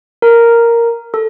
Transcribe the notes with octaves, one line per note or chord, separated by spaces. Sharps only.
A#4
A4